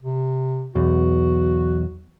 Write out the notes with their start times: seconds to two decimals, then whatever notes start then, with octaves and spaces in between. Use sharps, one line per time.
0.03 C3
0.75 B1 E2 F#4